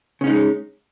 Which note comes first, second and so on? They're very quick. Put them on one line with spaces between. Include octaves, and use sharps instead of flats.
C#3 C#4 D#4 G#3